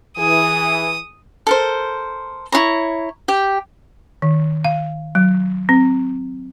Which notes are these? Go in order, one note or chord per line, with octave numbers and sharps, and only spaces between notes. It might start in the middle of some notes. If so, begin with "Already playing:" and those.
E3 G#4 D#6
A4 A#4 C5
E4 F4 C#5 A#5
G4 G5
D#3
F5
F#3
C4